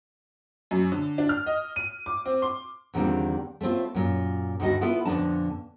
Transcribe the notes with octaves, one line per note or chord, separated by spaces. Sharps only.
F#2
D3
D4
F6
D#5
D#7
D6
C4
C6
E2 D3 D#3 G3 C4 F4
A3 B3 C4 F4
F#2 A#2
D2 G2 D#3 A3 F#4 D#5
B3 E4 F4 A4 B4
F2 A#2 D3 B3 D4 A5